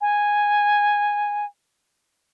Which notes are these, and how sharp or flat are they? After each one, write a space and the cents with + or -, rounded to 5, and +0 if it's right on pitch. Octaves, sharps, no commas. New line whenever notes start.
G#5 -5